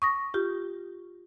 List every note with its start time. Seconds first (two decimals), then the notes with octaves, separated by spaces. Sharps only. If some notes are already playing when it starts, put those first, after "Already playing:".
0.02 C#6 D#6 A#6
0.34 F4 G4